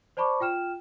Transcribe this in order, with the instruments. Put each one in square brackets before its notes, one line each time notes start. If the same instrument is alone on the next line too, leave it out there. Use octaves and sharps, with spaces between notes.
[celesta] C5 D5 A5 B5 C#6 D6
F4 G5 F6 E7